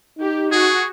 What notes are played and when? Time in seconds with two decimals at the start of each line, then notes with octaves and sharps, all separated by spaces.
0.19 D#4 G4
0.52 F#4 G#4